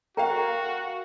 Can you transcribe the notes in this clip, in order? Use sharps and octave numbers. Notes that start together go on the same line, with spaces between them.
F#4 A#4 D5 F5 G5 A#5